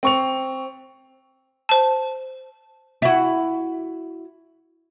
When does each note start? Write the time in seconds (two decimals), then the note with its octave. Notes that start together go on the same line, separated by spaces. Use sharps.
0.03 C4 C#6 F7
1.69 C5 A5
3.02 E4 F#4